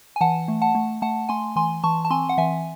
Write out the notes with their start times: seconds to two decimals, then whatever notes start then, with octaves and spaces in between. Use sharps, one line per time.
0.16 G#5
0.21 E3 F#5 A5
0.48 A3
0.62 F#5 A5
0.75 A3
1.02 A3 F#5 A5
1.29 A3 G#5 C6
1.56 E3 G#5 C6
1.84 E3 A5 C#6
2.05 A5
2.10 C4 G#5 C6
2.29 F#5
2.38 E3 E5 G#5